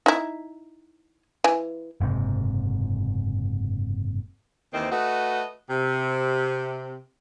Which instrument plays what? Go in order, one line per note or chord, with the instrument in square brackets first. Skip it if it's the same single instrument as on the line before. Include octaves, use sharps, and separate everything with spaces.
[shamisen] D#4 E4
E3
[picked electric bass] F#1 G#2 C3
[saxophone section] D#2 D#3 E3 C4
A3 F#4 B4 D#5
C3